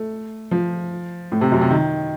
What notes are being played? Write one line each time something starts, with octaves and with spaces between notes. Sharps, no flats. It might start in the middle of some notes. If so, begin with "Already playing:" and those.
Already playing: A3
F3
A2
C3
F#2
C3
D#3